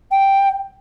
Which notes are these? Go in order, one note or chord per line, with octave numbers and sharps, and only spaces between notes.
G5